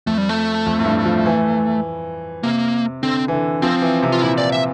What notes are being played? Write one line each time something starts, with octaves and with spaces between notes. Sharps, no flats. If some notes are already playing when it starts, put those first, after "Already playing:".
F2 A3
G3
A3
F2
A2
G2
F3
E3
C3 A#3
D3 C4
E3
D3
F3 C4
E3
C3
F4
A#2 E4
D5
E5